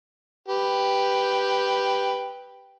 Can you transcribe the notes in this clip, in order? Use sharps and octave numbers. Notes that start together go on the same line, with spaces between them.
G4 B4 G5